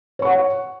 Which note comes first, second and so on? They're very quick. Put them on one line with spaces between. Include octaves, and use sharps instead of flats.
C#5 C#6 F#5